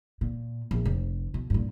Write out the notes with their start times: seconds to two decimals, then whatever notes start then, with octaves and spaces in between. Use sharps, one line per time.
0.21 A#2
0.71 A#1
0.85 F1
1.34 B2
1.50 G2 A#2